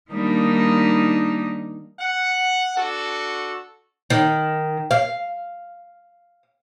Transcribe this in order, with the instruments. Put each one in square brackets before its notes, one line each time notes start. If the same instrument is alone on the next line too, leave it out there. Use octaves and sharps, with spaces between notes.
[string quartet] D#3 G3 A#3 D4 D#4
[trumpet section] F#5
D4 F#4 A4
[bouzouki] D#3
F5